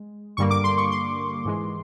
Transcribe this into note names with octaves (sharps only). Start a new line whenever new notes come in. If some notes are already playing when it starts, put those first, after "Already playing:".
Already playing: G#3
G2 D3 G3 A#3 C#6
D6
C6
C#6
C6
G#2 E3 G#3